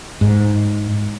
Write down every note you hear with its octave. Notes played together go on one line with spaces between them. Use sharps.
G#2